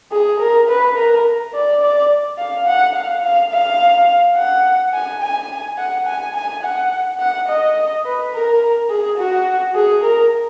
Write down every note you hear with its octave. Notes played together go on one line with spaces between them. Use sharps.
G#4
A#4
B4
A#4
D5
D5
F5
F#5
F5
F5
F5
F#5
G#5
G#5
F#5
G#5
G#5
F#5
F#5
D#5
B4
A#4
G#4
F#4
G#4
A#4